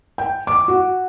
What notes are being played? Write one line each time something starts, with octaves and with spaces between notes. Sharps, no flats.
G5
D6
F#4